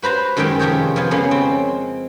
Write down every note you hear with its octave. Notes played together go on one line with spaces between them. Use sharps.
F#4 B4 C5 A#5 C6
F#2 D#3 G#3 G4 G5
F2 C3 G4 C#5 D#5
F3 B3 G#5
C#3 G#3 A#3 B3 C#4
C4